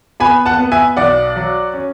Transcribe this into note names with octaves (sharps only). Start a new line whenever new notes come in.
B3 G#5 B5
F#5 A5
B3
E5 G#5
B1 D5 F#5
F#3
C#4